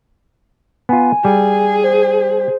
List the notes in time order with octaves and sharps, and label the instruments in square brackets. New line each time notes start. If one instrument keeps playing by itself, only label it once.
[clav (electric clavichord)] B3 F4 [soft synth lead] G#5
[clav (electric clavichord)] G3 [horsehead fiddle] G#4
[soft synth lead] C5